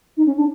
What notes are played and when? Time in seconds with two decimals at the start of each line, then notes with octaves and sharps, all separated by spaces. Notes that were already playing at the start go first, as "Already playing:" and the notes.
0.17 D#4
0.26 C#4
0.37 D4